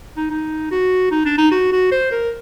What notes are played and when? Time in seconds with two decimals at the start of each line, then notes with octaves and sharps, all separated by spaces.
0.17 D#4
0.30 D#4
0.71 F#4
1.11 D#4
1.25 D4
1.38 D#4
1.51 F#4
1.72 F#4
1.92 C5
2.12 A#4